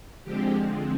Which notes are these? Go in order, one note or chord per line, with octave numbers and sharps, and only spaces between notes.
D3 F3 G#3 C4 G4